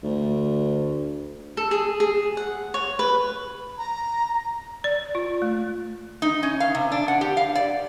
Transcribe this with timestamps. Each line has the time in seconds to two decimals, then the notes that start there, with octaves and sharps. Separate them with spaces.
0.03 D2
1.57 A4
1.71 G#4
2.00 G#4
2.37 F#5
2.74 C#5
2.99 B4
3.78 A#5
4.84 D5
5.15 F4
5.42 A3
6.22 D#4
6.43 C#4
6.60 F5
6.75 C3
6.92 D4
7.08 F#5
7.21 G4
7.37 F5
7.55 D5